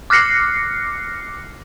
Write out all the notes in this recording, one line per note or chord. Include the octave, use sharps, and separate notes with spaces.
D6 F6 F#6 A#6 C7 C#7